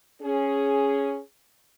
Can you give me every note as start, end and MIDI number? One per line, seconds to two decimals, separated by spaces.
0.21 1.19 61
0.21 1.19 68